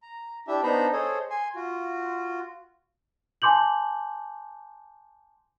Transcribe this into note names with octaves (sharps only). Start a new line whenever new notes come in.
A#5
D4 E4 G4 E5
B3 D4 D#4 C5 A#5 B5
G#4 A4 C5 C#5 D#5
G#5 C6
F4 F#4
G#5 A5 C6 D6 G6 F#7